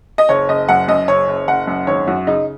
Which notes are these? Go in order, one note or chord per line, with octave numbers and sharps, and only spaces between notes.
D#5
F#1 C#5
F#1 D#5
F#2 F#5
F#2 D#5
F#1 C#5
F#1
F#1 F#5
F#2
G#1 C#5
F#2 F#4
C#3 D#4